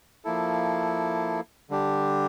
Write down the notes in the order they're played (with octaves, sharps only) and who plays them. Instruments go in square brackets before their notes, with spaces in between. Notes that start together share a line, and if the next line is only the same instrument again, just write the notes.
[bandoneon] F3 A#3 E4 A4
D3 G3 D4 G4